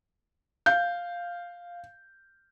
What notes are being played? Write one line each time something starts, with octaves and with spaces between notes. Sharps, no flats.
F5 G6